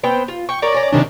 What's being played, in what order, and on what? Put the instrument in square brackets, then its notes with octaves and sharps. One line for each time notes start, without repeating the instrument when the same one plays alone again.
[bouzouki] B3 C4 G5
F4
[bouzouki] G5 [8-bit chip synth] C#6
[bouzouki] A#4 C#5 [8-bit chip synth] D5
[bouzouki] C#4 A#5
[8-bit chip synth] C3 D#3 D4